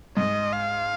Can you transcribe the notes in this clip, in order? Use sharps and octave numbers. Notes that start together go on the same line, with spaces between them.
G#2 D#5
F5